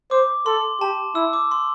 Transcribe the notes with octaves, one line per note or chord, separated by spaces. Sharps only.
C5 D6
A4 C6
G4 A5
E4 E6
D6
C6